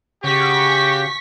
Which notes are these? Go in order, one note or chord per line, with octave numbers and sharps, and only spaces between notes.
C#3 F#4 G4 C#6 B6